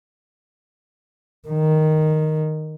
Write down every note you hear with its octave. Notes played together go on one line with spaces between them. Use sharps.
D#3